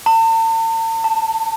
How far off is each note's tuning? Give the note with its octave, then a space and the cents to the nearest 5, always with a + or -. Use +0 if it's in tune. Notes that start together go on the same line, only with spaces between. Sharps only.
A5 +45
A5 +10